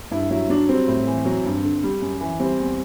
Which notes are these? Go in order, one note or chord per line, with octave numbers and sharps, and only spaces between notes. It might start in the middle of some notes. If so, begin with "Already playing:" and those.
G2 E4
F#3 E4
F#3 D4
G3 C4
A2
E3
F#3
G2
D3
G3
F#2
E3
G3 C4
E2